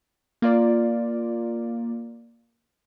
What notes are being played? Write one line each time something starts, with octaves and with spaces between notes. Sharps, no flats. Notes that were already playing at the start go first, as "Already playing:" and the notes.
A#3 F4 D5